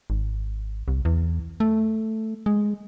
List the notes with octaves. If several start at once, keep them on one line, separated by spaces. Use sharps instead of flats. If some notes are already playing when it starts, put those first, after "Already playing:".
G#1
C2
E2
A3
G#3